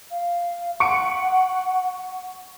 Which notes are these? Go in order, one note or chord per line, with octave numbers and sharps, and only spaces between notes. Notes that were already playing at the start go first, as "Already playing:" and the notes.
F5
F#5 C#6 C#7 D7